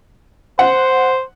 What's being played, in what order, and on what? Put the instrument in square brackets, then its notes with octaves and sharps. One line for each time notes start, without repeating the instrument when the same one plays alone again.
[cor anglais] C5 [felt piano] F#5